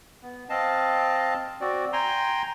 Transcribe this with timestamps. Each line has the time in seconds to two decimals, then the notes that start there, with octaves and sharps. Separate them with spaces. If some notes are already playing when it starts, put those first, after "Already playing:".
0.22 B3
0.50 C4 D#5 F5 A5
1.61 C4 F#4 D5
1.93 G5 G#5 A#5 C6